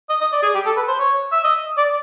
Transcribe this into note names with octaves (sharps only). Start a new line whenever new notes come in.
D#5
D#5
D5
G#4
G4
A4
B4
C5
C#5
E5
D#5
D5